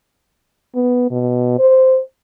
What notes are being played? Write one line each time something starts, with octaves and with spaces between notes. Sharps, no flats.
B3
B2
C5